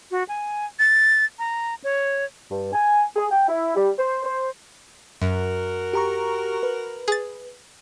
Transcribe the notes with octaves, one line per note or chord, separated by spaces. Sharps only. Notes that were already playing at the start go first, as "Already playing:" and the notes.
F#4
G#5
A6
A#5
C#5
G2
G#5
G#4
G5
E4
G3
C5
C5
F#2 F#4 A#4
G4 A#5 C#6
B4
G#4 A6